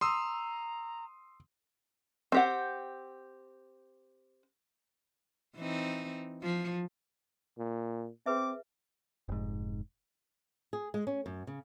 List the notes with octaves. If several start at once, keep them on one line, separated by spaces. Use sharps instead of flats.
A#5 C6 D#6 E6
C4 G4 F#5
E3 C4 D#4
F3
A#2
C4 G#4 B4 E5 D6
F1 G#2
G#4
G#3
C#4
F#2
C#3